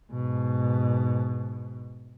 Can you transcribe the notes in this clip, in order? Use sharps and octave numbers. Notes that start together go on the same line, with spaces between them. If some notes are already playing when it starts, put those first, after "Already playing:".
G#2 B2